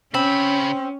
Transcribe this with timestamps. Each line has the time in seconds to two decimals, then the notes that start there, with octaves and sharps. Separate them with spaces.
0.14 C#3 C4 C#4 B5